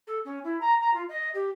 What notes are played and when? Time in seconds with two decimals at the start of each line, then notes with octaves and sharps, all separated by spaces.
0.07 A4
0.25 C#4
0.44 E4
0.61 A#5
0.80 A#5
0.93 F4
1.09 D#5
1.34 G4